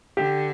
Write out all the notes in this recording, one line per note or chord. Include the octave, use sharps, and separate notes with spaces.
D3 G4